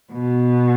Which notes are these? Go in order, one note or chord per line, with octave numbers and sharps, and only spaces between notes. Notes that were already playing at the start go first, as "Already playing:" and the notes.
B2